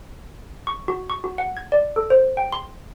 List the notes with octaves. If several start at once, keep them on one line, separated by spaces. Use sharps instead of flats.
C#6
F#4
C#6
F#4
F#5
G#6
D5
A4
C5
G5
C6